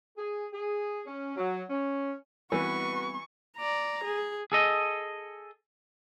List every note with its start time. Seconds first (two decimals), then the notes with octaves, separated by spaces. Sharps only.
0.18 G#4
0.53 G#4
1.06 C#4
1.37 F#3
1.70 C#4
2.52 E3 G3 B3 C4 F#4 B4 C#6
3.58 D5 A#5
4.04 G#4
4.52 G#4 A4 D#5